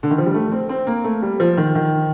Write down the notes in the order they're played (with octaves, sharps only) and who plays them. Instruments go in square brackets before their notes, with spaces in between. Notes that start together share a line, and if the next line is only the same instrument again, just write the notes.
[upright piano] D3
D#3
F3
G3
A3
C4
C4
A#3
A3
G3
F3
D#3
D#3